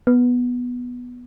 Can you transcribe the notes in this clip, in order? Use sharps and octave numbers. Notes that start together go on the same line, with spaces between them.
B3